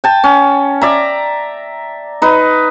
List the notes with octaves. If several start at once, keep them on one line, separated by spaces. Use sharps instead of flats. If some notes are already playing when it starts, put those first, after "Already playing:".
G5 A5
C#4
D5 E5 A#5
D#4 B4